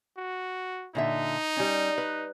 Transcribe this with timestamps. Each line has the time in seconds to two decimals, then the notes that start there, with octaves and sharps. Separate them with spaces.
0.17 F#4
0.95 A#2 D3 D#4 E5
1.57 G3 C#4
1.98 B4